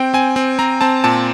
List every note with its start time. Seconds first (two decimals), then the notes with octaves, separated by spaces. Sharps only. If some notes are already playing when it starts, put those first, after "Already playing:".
Already playing: C4 G5
0.14 C4 G#5
0.36 C4
0.59 C4 A#5
0.81 C4 A5
1.04 A#2 A5